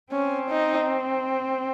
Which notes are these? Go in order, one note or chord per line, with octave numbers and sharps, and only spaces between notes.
C4 C#4
D#4